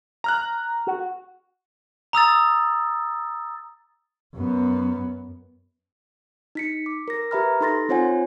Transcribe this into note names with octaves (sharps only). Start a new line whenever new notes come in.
A#5 F6 F#6
F#4
A#5 D#6 E6 A6
F#2 B3
D#4 B6 C#7
D6
A#4 A#6
G4 B4 E5 A#5 B5 F6
D#4 A4 C6 A6 A#6
C4 F4 C5 C#5 F#5 G#5